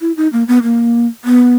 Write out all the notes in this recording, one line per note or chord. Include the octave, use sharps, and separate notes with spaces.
E4
D#4
A#3
B3
A#3
B3